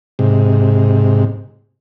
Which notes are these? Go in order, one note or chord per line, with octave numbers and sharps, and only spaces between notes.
G#2 C3